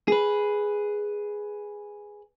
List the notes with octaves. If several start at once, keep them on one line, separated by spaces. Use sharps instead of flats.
G#4 B4